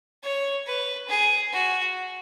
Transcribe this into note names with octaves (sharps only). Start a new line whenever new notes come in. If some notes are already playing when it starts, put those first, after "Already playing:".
C#5
B4
G#4
F#4